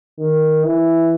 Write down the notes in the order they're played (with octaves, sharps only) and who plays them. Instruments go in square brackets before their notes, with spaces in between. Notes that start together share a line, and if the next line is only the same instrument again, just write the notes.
[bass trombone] D#3
E3